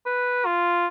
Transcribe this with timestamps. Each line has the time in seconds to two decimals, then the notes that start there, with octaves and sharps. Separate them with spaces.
0.06 B4
0.46 F4